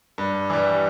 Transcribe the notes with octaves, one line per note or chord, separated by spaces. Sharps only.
G2
E3 G3